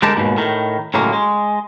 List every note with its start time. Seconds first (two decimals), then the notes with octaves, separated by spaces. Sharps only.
0.02 D3 G#3 G4 A#4 A5
0.16 D#2 G#2 B2
0.37 A2 D#3
0.94 A2 C#3 F#3 G#3 A#3
1.13 G#3